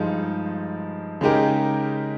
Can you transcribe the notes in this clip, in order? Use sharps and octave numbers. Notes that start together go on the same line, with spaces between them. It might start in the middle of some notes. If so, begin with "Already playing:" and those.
Already playing: G2 F3 G#3 D#4
C#3 G#3 D#4 G4 A#4